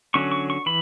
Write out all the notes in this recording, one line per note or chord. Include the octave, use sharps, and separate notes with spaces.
D3 F#3 C#4 C#6
C#6
C#6
E3 B5